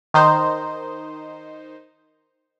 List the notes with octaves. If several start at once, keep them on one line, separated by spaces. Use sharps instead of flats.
D#3 D#4 C5